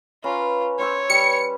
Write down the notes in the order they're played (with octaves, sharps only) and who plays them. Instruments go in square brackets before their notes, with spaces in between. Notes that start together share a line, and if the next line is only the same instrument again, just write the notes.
[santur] C#4 B4 A#5 [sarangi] F4
[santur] C#4 C5 E6 [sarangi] C#5
[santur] G3 B4 [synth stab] C#7